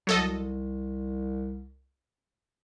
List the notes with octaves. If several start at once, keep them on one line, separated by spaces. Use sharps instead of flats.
C2 F#3 A4 D#5